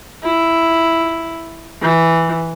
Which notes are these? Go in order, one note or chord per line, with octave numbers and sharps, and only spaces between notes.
E4
E3